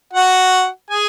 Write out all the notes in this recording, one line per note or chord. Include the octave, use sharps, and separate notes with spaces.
F#4 F#5
G#4 G#5